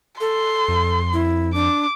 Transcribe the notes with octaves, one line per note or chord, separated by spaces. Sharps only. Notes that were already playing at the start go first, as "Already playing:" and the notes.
A4 C6
F2
E4
D4 D6